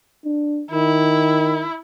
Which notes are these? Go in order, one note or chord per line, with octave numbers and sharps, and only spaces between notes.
D4
D#3 E4